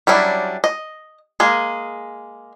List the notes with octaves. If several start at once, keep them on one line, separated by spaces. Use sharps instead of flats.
F#3 G3 C#4 D4 E4
D#5
G#3 A#3 G#4